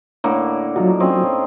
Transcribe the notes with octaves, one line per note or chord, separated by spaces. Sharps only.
A2 D3 A#3
F#3 D#4 F4 F#4
C4 C#4 D#5